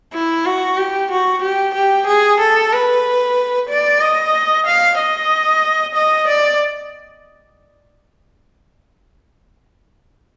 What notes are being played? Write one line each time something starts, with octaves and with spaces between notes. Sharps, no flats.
E4
F#4
G4
F#4
G4
G4
G#4
A4
B4
D5
D#5
F5
D#5
D#5
D5